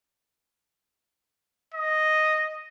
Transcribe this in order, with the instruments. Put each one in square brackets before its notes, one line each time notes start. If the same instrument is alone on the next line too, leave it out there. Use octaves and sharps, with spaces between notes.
[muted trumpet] D#5